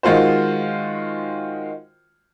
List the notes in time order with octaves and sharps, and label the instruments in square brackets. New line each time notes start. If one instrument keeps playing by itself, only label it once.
[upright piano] D#3 G#3 F4 F#4 C5